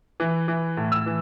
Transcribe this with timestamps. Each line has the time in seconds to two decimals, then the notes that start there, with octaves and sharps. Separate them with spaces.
0.20 E3
0.48 E3
0.77 A2
0.92 E6
1.06 E3